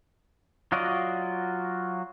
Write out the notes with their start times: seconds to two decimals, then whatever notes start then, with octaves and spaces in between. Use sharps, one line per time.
0.72 F#3 F4 F#4 D5 D#5